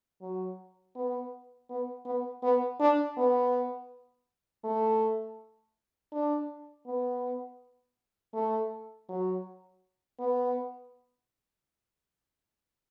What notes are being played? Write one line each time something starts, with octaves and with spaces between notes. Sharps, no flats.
F#3
B3
B3
B3
B3
D4
B3
A3
D4
B3
A3
F#3
B3